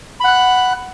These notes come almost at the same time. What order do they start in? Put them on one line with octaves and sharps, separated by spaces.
B5 F#5 F#6